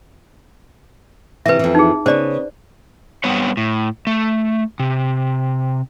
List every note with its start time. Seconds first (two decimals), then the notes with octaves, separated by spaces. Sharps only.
1.46 C3 E3 B4 E5
1.59 F2 E3
1.75 D#4 G#4
2.06 C#3 B3 C5 D5
3.24 G3 B3 C4 B4 C#5
3.57 A2
4.07 A3
4.80 C3